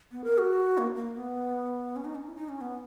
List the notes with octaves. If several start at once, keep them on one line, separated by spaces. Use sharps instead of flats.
B3
A#4
F#4
A#3
A#3
B3
C#4
D#4
C#4
E4
D#4
C#4
B3